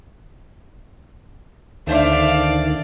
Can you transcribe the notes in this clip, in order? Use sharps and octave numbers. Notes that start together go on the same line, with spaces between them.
D2 D#3 A3 D4 C5 D5 E5 F5